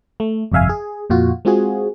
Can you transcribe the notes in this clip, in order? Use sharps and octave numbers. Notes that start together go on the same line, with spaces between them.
A3
G1 F2 C3 E5 F5 G#5
G#4
F2 A#2 F4 F#4
G#3 C4 F4 F#4 G#4